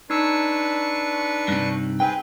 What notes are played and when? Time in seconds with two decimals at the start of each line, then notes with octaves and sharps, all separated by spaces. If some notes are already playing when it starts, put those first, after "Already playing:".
0.10 D4 D#4 B4 C#6 E6
1.48 G2 C3
2.00 C4 G#4 B4 G5